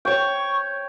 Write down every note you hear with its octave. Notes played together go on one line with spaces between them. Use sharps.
C#5 G5 C#6